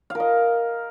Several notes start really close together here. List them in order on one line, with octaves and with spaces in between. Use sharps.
F5 A#4 D#5